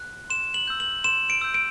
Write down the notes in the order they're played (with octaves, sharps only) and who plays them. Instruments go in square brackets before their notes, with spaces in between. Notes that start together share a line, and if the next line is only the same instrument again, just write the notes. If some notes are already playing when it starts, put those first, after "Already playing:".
Already playing: [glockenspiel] F#6
C6 E7
F#7
E6 G6
F#7
C6 E7
D7
E6 G6
D7